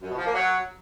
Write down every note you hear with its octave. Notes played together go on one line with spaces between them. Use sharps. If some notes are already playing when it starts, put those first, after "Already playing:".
F#2
B2
F3
A#3
F#3